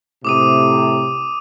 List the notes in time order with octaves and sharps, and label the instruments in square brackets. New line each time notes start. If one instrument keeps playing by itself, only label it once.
[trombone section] A2 C3 [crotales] D6 D#6 D#7